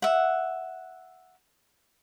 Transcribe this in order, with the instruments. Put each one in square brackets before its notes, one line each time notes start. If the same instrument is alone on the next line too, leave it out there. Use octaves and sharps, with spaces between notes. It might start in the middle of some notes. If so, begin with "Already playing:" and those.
[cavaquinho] E5 F#5